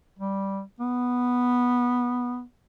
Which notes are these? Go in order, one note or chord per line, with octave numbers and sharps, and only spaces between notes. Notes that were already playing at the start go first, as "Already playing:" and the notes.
G3
B3